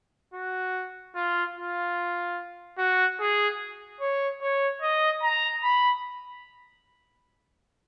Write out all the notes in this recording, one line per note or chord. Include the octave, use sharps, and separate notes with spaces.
F#4
F4
F4
F#4
G#4
C#5
C#5
D#5
A#5
B5